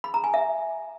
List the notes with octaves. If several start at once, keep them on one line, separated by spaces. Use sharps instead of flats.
B5
A#5
G#5
E5